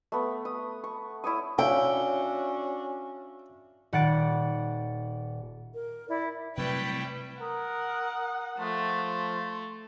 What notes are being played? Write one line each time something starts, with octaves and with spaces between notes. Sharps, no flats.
A3 B3
D#6
C#6
E4 C#5 C#6 D#6
C#4 D4 E4 F#4 C#5 F5 G5
D#1 F#5 A6 D7
A#4
E4 D5
C3 F#3 G3 A3 C4 E4 B4 G5
A#4 F#5 D#6
F3 A3 C6